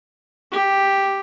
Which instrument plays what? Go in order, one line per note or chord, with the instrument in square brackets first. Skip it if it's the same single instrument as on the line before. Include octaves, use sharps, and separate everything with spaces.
[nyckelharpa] G4